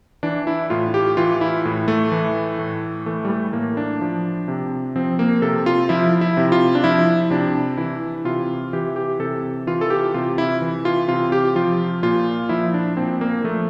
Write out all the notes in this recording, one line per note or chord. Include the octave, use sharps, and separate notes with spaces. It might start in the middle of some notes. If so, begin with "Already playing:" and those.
E3 D4
E4
A2 F4
G4
E3 F4
E4
A2
A3
E3
A2
E3 A3
G3
A3
A2 A#3
D4
F3
C3
F3 C4
A#3
C3 A4
F4
F3 E4
E4
C3
F4
D4
F3 E4
C3 D4
E3 E4
C3 F4
E3 G4
G4
C3 A4
E3 F4
A4
G4
C3 F4
E4
E3
F4
C3 F4
G4
F3 F4
A#2 F4
F3 E4
D4
A#2 C4
A#3
F3 A3